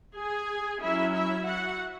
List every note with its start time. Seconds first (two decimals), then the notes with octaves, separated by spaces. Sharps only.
0.15 G#4 G#5
0.81 F#3 C#4 E4 E5
1.14 E4 E5
1.46 F#4 F#5